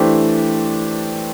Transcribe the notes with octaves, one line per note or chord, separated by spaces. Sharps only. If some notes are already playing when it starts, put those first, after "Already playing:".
Already playing: E3 A3 D4 G4 C5